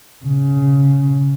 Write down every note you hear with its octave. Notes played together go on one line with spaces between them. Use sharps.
C#3